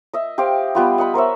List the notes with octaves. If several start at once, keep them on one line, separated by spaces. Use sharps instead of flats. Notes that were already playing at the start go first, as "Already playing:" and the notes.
D#5 E5
G4 C5 F5 G5
G3 B3 F4
D#5 F#5 B5
A#4 C5 C#5 E5